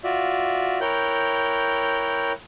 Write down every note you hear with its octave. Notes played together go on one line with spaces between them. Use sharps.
F4 F#4 D5 E5
E4 A#4 C#5 G5 F#6 G6